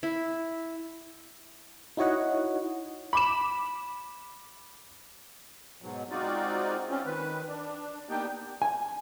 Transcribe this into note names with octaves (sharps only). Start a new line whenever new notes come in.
E4
D#4 E4 F#4 C#5 D#5 F#5
B5 D6 E7
G#2 B2 F#3
G#3 C4 D#4 F4 F#4 D5
C4 C#4 F4
D#3 B4
D4
A#3 B3 D4 D#4 G4 G5
G#5